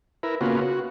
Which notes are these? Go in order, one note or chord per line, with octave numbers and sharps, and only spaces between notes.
E4 A#4 B4
C#3 A#3 B3 F4 F#4
F#4